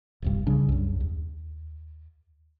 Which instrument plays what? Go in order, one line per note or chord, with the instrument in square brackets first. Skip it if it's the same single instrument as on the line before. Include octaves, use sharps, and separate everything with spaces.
[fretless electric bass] D#1 C2 G2
C2 C#3 G3 D4
C2 F#2
D#2